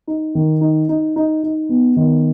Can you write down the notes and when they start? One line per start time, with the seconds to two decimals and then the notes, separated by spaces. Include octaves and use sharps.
0.07 D#4
0.35 D#3
0.61 D#4
0.89 D#4
1.16 D#4
1.43 D#4
1.69 B3
1.96 D#3